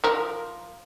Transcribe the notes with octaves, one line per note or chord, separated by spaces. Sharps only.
F3 A#4